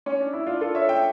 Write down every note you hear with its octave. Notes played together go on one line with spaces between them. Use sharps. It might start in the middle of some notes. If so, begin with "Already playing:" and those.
C#4
D4
E4
D4 F4
F4 A4
C#5 E5
E5 G5